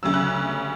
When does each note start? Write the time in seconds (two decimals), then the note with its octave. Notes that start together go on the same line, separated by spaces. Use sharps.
0.03 D2 C#3 F#3 E6
0.14 F#6